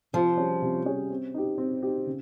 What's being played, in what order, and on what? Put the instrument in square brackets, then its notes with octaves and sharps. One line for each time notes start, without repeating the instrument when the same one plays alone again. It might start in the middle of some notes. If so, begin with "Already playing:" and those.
[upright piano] C3 [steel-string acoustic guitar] F3
[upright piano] G3 C#4 G#4 C#5
C3
G3 C#4 G#4 C#5
C4
D#4 G4
C4
D#4 G4
C#3